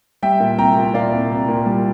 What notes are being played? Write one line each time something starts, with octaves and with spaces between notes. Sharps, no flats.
G3 E5 G5
A#2
C2 G5 A#5
A#2
A#2 D5 F5
C2
C2
A#2
G3